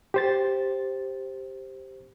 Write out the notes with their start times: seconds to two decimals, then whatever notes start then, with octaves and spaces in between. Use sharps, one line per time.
0.14 G4 C5 A6